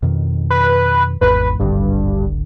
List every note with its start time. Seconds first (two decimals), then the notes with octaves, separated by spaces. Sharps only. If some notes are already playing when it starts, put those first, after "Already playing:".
0.02 F2 B2 D#3
0.50 B4
1.21 G#1 E2 G#2 B4
1.59 D1 G#1 G2 D3